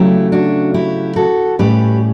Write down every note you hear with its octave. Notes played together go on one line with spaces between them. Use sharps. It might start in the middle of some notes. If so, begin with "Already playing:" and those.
Already playing: C#3 F#3 A3 E4 G4
D4 F#4
E4 G4
F#4 A4
A2 G3 C#4 G4 B4